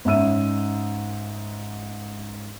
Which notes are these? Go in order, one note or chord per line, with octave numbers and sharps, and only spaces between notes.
G#2 C#4 E5 E6 D#7